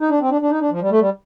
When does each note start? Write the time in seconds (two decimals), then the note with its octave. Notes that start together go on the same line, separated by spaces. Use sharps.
0.01 D#4
0.10 D4
0.21 C4
0.30 D4
0.41 D4
0.50 D#4
0.61 D4
0.71 F3
0.81 G3
0.91 A3
1.01 G3